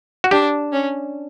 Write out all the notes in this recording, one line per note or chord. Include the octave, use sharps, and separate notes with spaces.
F#4
D4 G4
C#4